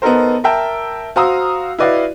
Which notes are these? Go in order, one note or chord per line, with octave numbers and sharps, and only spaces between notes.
B3 D#4 A4 A#4 C5
A#4 E5 G5 A5
F#4 C5 F5 A#5 D#6 E6
E4 F#4 B4 D5 D#5 F5